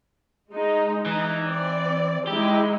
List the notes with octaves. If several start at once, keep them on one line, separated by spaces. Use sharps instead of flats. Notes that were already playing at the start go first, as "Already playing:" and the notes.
G#3 D#4
E3 D#4
C4 D5
G#3 D#4 E4 G4